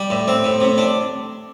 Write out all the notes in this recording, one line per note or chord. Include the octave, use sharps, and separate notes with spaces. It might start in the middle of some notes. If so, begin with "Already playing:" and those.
Already playing: G3
A2
C4
A2
C3
D4